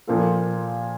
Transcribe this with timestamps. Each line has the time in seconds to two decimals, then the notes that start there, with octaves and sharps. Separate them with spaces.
0.08 A#2 F3 A#3 F4 A4